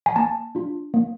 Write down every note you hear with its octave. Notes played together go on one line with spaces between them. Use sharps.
G#5
A#3 A5
D4 F4
A#3